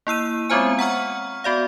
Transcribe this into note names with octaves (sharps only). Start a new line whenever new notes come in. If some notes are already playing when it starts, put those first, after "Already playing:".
A#3 E4 E6 D#7
G#3 B3 C4 F4 C5 G#5
F#5 A#5 C#6 F6
B3 F#4 D5 F5